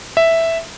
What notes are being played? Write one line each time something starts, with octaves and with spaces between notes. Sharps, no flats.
E5